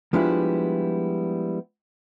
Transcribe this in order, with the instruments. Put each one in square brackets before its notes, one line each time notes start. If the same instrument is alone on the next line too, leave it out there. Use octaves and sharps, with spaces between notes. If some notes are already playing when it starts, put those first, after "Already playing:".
[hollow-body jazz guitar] F3 G3 G#3 B3 D4 E4